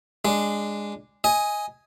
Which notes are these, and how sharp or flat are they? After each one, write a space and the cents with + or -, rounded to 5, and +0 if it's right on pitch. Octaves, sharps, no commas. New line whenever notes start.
G#3 -10 D4 +0
D#5 +10 G#5 +0